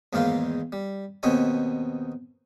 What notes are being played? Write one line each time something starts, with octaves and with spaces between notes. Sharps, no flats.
E2 G#2 D#3 A#3 F4 F5
G3
D#2 B2 C4 D#4 C#5 G#5